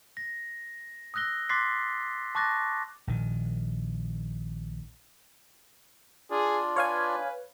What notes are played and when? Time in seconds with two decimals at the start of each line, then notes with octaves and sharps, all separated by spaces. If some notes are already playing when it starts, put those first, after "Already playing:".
0.17 A#6
1.14 D#6 E6 F#6 A#6 G7
1.49 C6 D6 F#6 A6 B6 C7
2.35 A5 C#6 D6 F#6 A6 A#6
3.07 A#1 D#3
6.30 D4 F4 G#4 D5
6.76 B4 C#5 F5 G#5